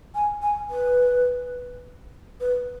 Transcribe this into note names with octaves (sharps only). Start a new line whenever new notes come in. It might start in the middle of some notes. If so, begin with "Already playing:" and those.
G#5
G#5
B4
B4